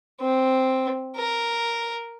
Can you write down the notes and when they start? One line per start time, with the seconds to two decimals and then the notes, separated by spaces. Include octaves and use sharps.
0.21 C4
1.17 A#4